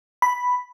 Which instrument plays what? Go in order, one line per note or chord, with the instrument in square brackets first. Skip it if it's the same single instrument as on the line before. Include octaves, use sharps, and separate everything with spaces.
[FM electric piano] B5